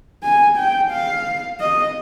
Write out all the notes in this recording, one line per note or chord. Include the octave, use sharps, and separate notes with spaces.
G#5
G5
F5
D#5